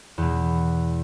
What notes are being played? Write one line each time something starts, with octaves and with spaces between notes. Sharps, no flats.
E2 B2